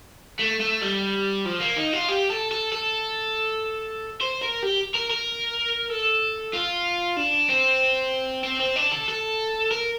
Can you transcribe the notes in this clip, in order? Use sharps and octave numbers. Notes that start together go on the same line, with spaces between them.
A3
A3
G3
F3
A#3
D#4
F4
G4
A4
A4
A4
C5
A#4
G4
A#4
A#4
A4
F4
D4
C4
C4
C4
D4
A4
A4
A#4